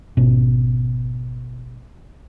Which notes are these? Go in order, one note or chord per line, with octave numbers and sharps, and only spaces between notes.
G#1 B2 C#4